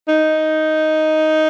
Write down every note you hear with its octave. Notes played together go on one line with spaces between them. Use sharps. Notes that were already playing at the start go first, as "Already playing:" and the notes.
D#4